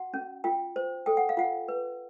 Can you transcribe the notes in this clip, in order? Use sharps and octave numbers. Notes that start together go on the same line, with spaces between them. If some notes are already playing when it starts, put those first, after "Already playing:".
Already playing: F#4 F#5
C#4
F4 G5
C5
A4 G5
F#5
F5
F4 F#5
B4